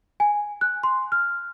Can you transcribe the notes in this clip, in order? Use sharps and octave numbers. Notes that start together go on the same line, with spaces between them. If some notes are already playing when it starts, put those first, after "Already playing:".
G#5
F#6
C6
F6